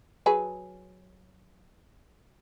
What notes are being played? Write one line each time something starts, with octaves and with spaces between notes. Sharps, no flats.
F#3 G#4 B4